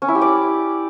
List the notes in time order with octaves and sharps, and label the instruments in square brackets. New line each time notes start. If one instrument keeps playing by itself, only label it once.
[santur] C#4
E4
G4
D5